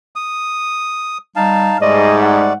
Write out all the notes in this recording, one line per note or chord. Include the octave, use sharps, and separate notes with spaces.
D#6
G3 D#4 F5 A5
G#2 G3 A3 D5 D#5
F#5